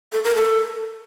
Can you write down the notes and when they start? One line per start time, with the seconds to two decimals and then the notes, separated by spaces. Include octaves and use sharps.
0.12 A4
0.24 A#4
0.36 A4